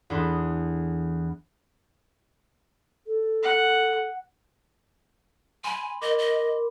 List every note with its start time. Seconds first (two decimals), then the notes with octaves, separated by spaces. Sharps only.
0.10 E2 D4 A4 B4 C6 D#6
3.07 A4
3.43 F#5
5.64 G#5 B5 C6
6.02 A#4 D#5 D6
6.19 D#5